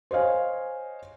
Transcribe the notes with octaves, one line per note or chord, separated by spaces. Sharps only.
C5 C#5 D#5 F5 G#5